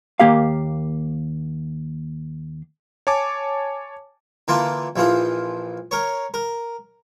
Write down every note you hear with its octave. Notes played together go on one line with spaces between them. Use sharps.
D#2 A#3 G4 F5
C#5 G#5 A5 D6
D3 E3 A#3 F4 A5
A#1 E3 F3 F4
A#4 C#5
A#4